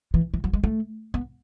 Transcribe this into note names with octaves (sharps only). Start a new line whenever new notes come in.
E3
E3
F#3
G#3
A3
B3